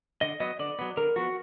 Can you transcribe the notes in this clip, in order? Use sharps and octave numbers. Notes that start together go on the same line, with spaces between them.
D3 D#5
F#3 B3 D#5
D3 D5
F#3 B3
D3 A#4
F3 B3 F#4